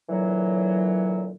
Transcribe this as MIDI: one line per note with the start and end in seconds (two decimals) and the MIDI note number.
0.10 1.33 46
0.10 1.33 50
0.10 1.33 52
0.10 1.33 54